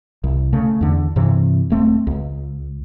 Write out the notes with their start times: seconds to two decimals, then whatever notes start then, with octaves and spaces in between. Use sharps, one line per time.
0.24 C2
0.53 C#3 A3
0.81 E2 D3
1.16 G2 C3 E3
1.70 D#1 A3 C4
2.07 C#2